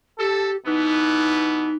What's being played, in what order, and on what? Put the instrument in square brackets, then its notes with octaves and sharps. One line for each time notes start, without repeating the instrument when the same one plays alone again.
[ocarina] G4 [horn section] A4
[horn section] B2 E3 B3 [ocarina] D#4